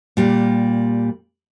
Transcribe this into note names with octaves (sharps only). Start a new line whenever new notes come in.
A#2 G3 A#3